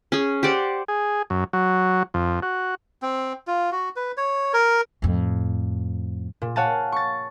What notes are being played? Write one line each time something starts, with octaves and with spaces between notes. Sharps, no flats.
C#4 G#4
G4 C5 D5 F#5
G#4
F#2
F#3
F2
F#4
C4
F4
F#4
B4
C#5
A#4
F2 A2
A#2
C#5 F5 F#5 G#5 A5
C#6 A6